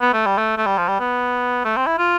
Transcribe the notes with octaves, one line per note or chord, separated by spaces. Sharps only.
B3
A3
G3
A3
A3
G3
F3
G3
B3
A3
C4
E4
F4